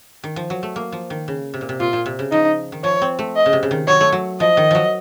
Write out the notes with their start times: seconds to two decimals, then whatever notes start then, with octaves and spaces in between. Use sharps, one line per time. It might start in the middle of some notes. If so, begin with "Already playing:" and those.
0.24 D#3
0.36 F3
0.50 F#3
0.63 A3
0.76 A#3
0.92 F3
1.10 D#3
1.28 C#3
1.54 C3
1.61 A#2
1.69 C3
1.80 A#2 F4
1.93 A#2
2.06 C3
2.19 C#3
2.32 F3 D#4
2.72 D#3
2.84 F3 C#5
3.02 C4
3.19 A3
3.37 D#5
3.46 C#3
3.53 C3
3.63 C#3
3.71 D#3
3.88 F#3 C#5
4.01 A3
4.12 F#3
4.40 F3 D#5
4.57 D#3
4.71 F3 F#3